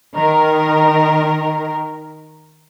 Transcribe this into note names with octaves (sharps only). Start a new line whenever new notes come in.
D#3 A#4